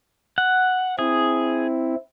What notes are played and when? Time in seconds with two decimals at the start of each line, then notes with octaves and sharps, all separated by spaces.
0.38 F#5
0.99 C4 E4 G#4